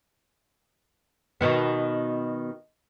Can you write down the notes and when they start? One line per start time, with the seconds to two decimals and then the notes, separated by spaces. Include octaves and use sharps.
1.41 B2 D#3 B3